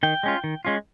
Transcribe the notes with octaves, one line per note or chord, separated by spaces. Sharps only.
D#3 G5
G#3 C#4 F4
D#3
G#3 C#4 F4